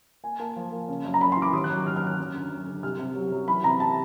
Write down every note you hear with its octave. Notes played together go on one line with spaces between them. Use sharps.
A#3 G#5
A#3 A5
F3
A#3
C#3
F#2
A#5
F#2 B5
C6
E3
D6
D#2 D#6
F#6
F#3
D#2 F6
F6
F#3
F#6
F#2
D3
F#2
D3
C2 F6
C3
F#3
F#3
E3 B5
C3 A#5
A5